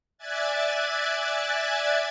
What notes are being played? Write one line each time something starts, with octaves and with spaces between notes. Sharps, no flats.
D5 E5 G#5 F#6 G#6 A6